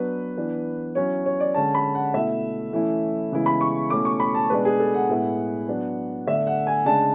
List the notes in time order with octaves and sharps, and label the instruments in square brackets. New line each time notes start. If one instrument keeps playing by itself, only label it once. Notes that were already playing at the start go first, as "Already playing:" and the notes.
Already playing: [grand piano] F#3 B3 D4 B4
E3 B3 D4
F#3 C#4 E4 C#5
C#5
D5
D3 G#3 C#4 A5
B5
F#5
B2 A3 E4 E5
E3 A3 C#4 E4
C#3 E3 G#3 B3 E4
B5
C#6
B2 A3 C#4 E4 D6
C#6
B5
A5
B2 G#3 D4 B4
G#4
A4
F#5
A2 G#3 B3 E4
F#3 B3 D4
D3 A3 D4 E5
F#5
G#5
C#3 G#3 D4 A5